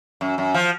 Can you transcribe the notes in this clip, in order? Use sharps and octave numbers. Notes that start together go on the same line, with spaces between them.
F#2
F#2
F3